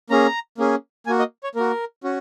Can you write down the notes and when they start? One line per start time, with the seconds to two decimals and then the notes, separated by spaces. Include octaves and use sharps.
0.10 A#3 C#4 G#4 A#5
0.58 A#3 C#4 G#4
1.06 A#3 F#4 G#5
1.19 D#5
1.44 C#5
1.55 A#3 F#4 A#4
2.04 C#4 F#4